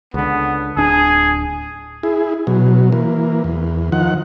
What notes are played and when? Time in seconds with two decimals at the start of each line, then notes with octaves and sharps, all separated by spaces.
0.14 C#2 D3 B3
0.77 D1 D4 G#4
2.03 E4 G#4
2.47 B2 F#3
2.92 E3 A#3
3.44 E2
3.92 D#3 F3 F#5